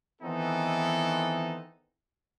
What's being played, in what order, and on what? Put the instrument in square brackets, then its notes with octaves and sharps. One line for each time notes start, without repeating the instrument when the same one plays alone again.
[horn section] D#3 E3 B3 C4 D#4 A4